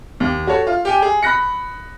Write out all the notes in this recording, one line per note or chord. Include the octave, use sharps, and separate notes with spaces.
D#2
F#4 A4 C#5
F4
G4 G5 G#5
G#4
B5 F#6 A#6 C#7